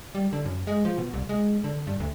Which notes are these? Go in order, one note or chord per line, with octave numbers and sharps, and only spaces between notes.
G3
D3
F#2
G#3
F3
B2
C2
G#3
D3
G2
D2